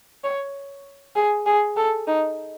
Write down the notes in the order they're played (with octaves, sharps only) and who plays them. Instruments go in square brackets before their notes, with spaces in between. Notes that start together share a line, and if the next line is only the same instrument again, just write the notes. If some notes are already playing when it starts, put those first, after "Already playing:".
[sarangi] C#5
G#4
G#4
A4
D#4